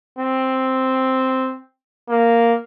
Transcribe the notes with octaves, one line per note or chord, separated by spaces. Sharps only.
C4
A#3